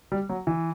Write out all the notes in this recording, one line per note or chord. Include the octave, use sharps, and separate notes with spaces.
G3
F#3
E3